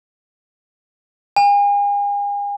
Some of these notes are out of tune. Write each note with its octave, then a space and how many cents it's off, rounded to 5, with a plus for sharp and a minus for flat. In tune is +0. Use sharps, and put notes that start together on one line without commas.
G#5 -40